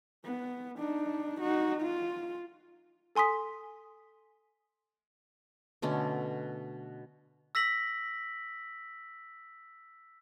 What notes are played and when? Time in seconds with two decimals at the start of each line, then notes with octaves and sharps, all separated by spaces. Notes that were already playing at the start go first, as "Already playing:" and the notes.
0.25 B3
0.78 D4 D#4
1.40 D#4 F#4
1.82 F4
3.16 A4 G#5 C6 D#6 B6
5.82 B2 D3 A3 C#4
7.55 E6 A#6 B6 F#7